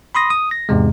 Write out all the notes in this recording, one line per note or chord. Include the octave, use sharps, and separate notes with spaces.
B5 C6 D#6 A#6
D#6
A#6
E2 G#2 C3 G#3